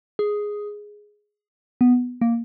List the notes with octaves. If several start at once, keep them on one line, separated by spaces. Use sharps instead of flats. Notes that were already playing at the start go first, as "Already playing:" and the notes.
G#4
B3
A#3